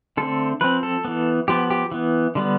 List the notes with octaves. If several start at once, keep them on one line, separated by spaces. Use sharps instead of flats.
D3 A3 C4 A4
F3 C4 B4
A4
E3 B3
F3 B3 G4
G4
E3 B3
D3 G3 B3